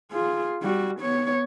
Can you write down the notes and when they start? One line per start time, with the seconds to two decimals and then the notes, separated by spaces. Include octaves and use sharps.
0.11 F4 G#4
0.62 G3 F#4
1.00 B3 C#5